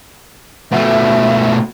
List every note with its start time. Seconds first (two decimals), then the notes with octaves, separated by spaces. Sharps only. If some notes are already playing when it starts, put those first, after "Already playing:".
0.72 B2 A3 E5